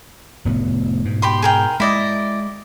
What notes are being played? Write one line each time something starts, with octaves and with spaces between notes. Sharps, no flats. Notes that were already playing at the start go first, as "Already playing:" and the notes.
F1 A2 B3
G#2 B2
G4 B5 C6
G#4 A#4 G5
G#3 E4 D5 D#5